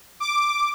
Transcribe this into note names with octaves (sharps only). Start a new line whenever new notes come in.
D6